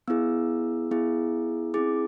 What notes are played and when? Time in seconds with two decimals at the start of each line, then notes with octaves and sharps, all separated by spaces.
0.08 B3 E4 G#4 E6
0.91 B3 E4 G#4
1.74 C4 E4 G#4 D6